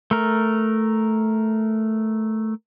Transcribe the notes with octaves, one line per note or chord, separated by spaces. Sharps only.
A3 A#4